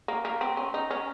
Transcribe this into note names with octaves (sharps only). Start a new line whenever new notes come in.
A#3
A#3
C4
C#4
D#4
C#4